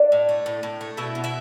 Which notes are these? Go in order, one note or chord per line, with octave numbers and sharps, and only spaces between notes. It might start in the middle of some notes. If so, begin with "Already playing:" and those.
Already playing: D4 D5
A2
A3
A2
A2
A3
B2 E4 E5
B2
E4 E5